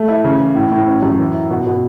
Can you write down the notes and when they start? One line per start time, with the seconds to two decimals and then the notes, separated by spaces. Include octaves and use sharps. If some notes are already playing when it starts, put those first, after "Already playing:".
Already playing: A3
0.08 E4
0.24 C#3
0.40 E3
0.55 A2
0.71 A2
0.86 C#4
1.02 F#2
1.18 E3
1.34 E4
1.50 B2
1.66 B2